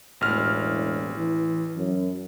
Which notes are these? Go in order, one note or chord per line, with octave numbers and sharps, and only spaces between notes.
E1 A1 F6
E3
F#2